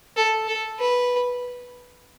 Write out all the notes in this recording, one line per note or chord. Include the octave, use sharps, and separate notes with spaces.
A4
A4
B4